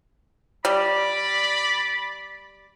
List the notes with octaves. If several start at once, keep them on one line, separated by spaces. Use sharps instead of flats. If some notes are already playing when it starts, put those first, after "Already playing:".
G3 D5 B5